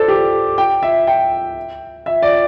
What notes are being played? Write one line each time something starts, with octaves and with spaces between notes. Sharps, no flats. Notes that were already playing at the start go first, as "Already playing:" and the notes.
Already playing: A4 C5 D5
G4
G5
E5
G5
E5
D5